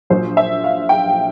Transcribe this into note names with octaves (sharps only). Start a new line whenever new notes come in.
A#1 A#2 F#3 C5
E5
F5
G5